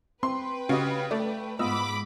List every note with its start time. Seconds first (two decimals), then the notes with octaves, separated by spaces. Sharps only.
0.23 C4 B4 G5 C6
0.69 C#3 F#4 G4 D#5
1.11 A3 D5
1.59 G#2 B3 F4 D#5 B5 D6 E6